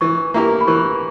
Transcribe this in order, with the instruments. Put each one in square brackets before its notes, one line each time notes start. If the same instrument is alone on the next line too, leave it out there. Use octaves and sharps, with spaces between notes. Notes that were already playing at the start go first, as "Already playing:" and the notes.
[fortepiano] E3 [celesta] C#6
[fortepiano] A#3 E4 G4 A#4
[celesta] B5
[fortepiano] E3 [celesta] C#6